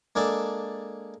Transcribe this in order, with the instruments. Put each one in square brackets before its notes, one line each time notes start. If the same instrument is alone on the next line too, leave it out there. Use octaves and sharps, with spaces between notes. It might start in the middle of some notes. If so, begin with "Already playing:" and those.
[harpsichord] G#3 A#3 D4 G#4 A4